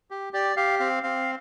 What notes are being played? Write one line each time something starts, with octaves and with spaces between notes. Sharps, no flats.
G4
G4 D5
G4 F5
C4 F5
C4 F5